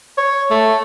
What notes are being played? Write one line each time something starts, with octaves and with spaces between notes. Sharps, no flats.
C#5
A3